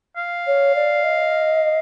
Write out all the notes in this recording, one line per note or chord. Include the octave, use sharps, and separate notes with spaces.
F5
C#5
D5
D#5